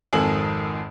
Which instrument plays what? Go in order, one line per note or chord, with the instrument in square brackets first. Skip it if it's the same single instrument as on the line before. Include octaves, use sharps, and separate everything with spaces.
[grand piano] G#1 F2 D#3 A4 G#5 F#7